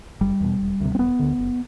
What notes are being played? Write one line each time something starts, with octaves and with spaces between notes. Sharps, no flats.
F#1 G3
E2 B2
E1
D2 C3
C4
E1 B3
D2 D3
F#1